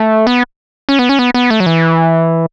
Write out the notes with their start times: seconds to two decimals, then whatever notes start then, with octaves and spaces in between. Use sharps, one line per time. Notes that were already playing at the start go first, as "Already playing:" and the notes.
Already playing: A3
0.27 B3
0.89 C#4
0.99 B3
1.09 C#4
1.19 B3
1.34 B3
1.50 A3
1.60 F#3
1.66 E3